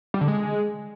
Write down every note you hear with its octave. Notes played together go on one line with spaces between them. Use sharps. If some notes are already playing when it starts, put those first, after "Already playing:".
G3
D3
G#3